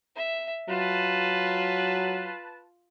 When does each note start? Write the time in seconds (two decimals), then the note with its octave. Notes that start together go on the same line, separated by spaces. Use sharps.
0.16 E5
0.69 F#3 F4 B4 A5